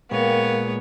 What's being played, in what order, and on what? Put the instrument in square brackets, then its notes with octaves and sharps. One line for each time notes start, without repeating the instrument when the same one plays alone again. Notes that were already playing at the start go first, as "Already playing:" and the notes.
[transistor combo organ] A#2 G#3 [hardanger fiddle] B3 C#5 [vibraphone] A#4 F5 G5